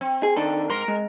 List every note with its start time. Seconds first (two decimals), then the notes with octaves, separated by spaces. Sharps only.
0.01 C4
0.23 G#4
0.37 D#3 D4 A4
0.70 G#2 A#4 C6
0.88 G#3